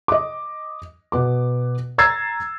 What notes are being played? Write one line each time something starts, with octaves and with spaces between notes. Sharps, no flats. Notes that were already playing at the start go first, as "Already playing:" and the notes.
D#5 D6
B2 B3 D6
A#5 E6 G#6 A6 C7